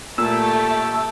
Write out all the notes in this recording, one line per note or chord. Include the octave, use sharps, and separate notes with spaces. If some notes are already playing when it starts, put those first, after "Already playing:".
A#2 A3 G4 A5 E6